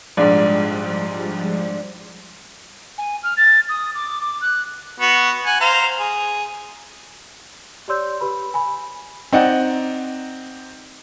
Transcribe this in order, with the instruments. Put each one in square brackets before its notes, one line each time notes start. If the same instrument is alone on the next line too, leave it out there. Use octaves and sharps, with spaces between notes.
[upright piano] A#1 G#2 [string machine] F3 G3 G#3 [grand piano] D4 D5
[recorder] G#5
F6
A6
D#6
D6
D6
F#6
[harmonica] B3 F#4
F#5 G#5
C5 F5 A#5
G#4
[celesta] G4 C#5 D5 C6 E6 G6
G4 B4 B5
G#5 B5
[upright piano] C4 D#4 D5 F#5